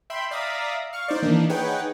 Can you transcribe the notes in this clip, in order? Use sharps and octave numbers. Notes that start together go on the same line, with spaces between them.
E5 G5 B5 C6
D5 E5 F5 A#5 D#6
F5 C#6 F6
D#4 C5 D5
D#3 E3 A#3 D4 D#4
D#4 G#4 B4 C#5 F#5 G5